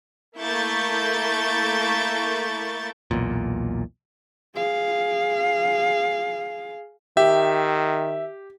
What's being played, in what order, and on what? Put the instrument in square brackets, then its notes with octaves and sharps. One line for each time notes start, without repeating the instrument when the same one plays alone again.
[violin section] A3 A#3 E4 C#6 G6 A6
[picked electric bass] B1 E2 A#2
[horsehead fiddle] G#4 F5
[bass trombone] D#3 [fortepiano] G4 [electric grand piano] E5